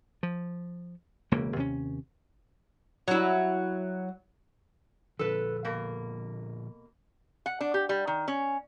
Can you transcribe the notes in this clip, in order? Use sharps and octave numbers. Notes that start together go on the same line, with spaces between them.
F3
E1 C#2 C#3 A#3
D#2 C3 C4 C#4
F#3 E4
A#2 D3 F3 A4 B4
B2 A#3
F#5
D4
G4
G3
D#3
C#4